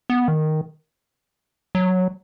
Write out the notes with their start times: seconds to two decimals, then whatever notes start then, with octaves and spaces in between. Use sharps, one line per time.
0.10 B3
0.28 D#3
1.75 F#3